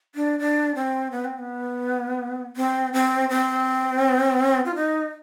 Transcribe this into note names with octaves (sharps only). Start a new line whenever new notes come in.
D4
D4
C4
B3
C4
B3
C4
C4
C4
F4
D#4